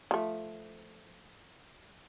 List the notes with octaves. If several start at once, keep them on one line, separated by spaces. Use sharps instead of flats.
F3 A3